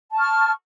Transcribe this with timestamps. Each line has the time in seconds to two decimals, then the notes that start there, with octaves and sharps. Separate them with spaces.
0.12 A5
0.15 C#6
0.19 F6